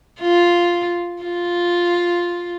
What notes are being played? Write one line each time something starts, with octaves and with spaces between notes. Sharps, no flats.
F4
F4